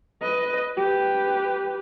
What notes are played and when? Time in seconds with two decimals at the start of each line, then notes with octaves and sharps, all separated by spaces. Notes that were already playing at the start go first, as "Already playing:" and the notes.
0.22 B4 D#5
0.77 G4 B4